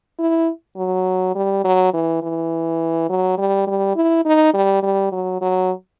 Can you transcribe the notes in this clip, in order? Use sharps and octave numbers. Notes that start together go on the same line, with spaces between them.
E4
F#3
G3
F#3
E3
E3
F#3
G3
G3
E4
D#4
G3
G3
F#3
F#3